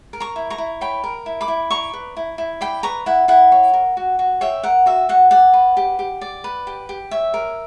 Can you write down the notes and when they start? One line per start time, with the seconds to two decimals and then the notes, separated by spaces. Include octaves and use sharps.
0.13 A#4
0.20 A#5 C#6
0.36 E4
0.50 A#5 C#6
0.58 E4
0.81 C#5 G5 B5
1.04 A#4
1.26 E4
1.41 B5 D6
1.48 E4
1.71 D5 A#5 C#6
1.94 B4
2.17 E4
2.38 E4
2.61 D5 G5 B5
2.83 B4 A#5 C#6
3.06 E4 F#5
3.28 E4 F#5
3.52 C#5
3.73 A#4
3.97 F#4
4.19 F#4
4.41 C#5 E5 G5
4.64 A#4 F#5
4.86 F#4 E5
5.09 F#4 F#5
5.31 D5 F#5
5.54 B4
5.77 G4
5.99 G4
6.21 D5
6.44 B4
6.67 G4
6.89 G4
7.11 C#5 E5
7.34 A#4